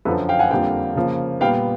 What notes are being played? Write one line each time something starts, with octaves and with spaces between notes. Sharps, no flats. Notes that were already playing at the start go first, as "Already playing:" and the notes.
F#2 D3 F3 A4 B4
F5 G5
F#5 G#5
F2 D3 G3 A#3 F5 G5
C#3 F3 A#3
A#2 G3 B3 F5 G5